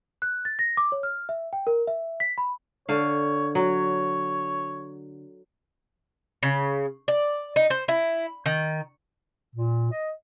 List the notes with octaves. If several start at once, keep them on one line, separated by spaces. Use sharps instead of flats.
F#6
A6
A#6
D6
C#5
F6
E5
G5
A#4
E5
B6
B5
D3 C#5 F5
F#3 C#5
C#3
D5
D#4
C5
E4
D#3
A#2
D#5